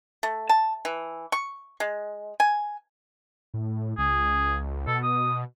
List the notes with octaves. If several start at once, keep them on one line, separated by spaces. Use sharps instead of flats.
A3
A5
E3
C#6
G#3
G#5
A2
C#2 G#4
B2 A4
D#6